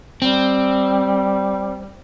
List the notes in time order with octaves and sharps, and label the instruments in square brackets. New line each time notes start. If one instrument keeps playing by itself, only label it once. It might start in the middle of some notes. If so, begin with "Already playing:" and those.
[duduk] G3 [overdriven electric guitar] C4